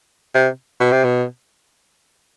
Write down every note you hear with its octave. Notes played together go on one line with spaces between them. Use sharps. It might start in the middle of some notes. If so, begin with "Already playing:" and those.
C3
B2
C3
B2